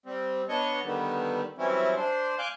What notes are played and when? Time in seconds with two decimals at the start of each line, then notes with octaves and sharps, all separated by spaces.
0.06 G3 C4
0.49 B3 D4 C#5 D#5 C#6
0.84 D3 D#3 G3 B3
1.58 E3 F#3 G3 C4 C#4 E4
1.96 D4 C5
2.39 F5 G#5 D6 F#6 G6